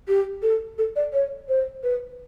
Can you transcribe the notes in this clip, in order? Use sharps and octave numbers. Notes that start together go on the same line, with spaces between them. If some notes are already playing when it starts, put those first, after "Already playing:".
G4
A4
A4
D5
C#5
C5
B4